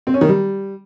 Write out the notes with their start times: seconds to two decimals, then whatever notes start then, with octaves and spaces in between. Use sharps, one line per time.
0.07 C4
0.14 C#4
0.21 D#3
0.28 G3